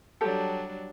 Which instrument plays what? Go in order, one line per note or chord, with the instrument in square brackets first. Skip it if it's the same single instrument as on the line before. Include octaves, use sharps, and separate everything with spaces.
[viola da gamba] F#3 G3 D4 [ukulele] G4 A4 A5